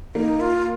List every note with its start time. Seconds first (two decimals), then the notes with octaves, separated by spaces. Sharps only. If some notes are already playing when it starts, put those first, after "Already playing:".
0.15 A#3 D#4
0.40 F4